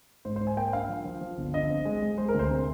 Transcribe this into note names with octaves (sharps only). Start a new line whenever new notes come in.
G#2 C5
C5
G#2
G#5
A#3 G5
D4 F5
F3
F3
F3
G1
D3 D#5
C4
G#3
G#3
G#3 C5
A#4
D2
C5
C3